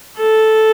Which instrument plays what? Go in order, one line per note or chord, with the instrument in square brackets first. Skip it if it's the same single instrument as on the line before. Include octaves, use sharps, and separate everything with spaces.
[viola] A4